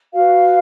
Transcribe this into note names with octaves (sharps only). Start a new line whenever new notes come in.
F#4 B4 F5